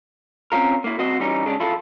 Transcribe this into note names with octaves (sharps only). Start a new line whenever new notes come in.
C4 C#4 F4 A#4
A#3 E4
C2 C4 F#4 C5 D#5
E3 G3 C#4 D#4
C#3 G#3 C#4 D4
F3 E4 F4 A4